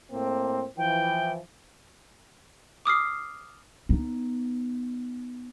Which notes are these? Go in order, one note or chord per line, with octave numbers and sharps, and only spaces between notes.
A2 A#3 C4
E3 F3 G5
D6 D#6 F6 C7
B3 D#4